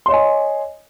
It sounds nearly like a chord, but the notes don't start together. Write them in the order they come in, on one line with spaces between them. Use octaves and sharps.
C6 C#5 D#5 G#5